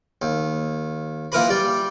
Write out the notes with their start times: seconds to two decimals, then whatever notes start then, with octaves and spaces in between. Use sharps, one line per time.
0.22 D#2
1.32 A#2 E3 A#4 B4 B5
1.49 G3 D5